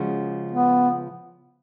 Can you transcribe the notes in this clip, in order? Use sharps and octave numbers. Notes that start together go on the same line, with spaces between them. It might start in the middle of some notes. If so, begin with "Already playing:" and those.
Already playing: C#3 F3 G#3 C#4 F#4
B3